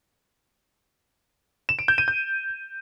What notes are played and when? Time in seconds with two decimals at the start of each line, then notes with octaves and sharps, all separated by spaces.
1.69 E7
1.79 D7
1.88 G6
1.98 D#7
2.08 G6